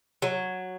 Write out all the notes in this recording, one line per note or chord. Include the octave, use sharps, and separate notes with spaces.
F#3